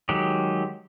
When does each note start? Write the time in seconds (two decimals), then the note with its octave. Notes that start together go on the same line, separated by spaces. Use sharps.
0.09 D#3 F#3 G#3 G4